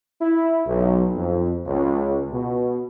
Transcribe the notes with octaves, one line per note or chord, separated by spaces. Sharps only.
E4
B1
F2
C#2
B2